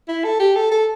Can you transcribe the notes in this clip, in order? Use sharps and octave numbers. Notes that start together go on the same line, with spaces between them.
E4
A4
G4
A4
A4